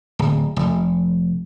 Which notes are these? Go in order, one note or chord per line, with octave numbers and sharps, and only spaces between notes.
D1
F1